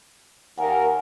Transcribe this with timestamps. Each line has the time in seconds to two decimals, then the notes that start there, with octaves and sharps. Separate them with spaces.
0.58 D#2 A#4 F#5 G#5